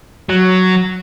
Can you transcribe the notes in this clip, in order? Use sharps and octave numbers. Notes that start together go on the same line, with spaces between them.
F#3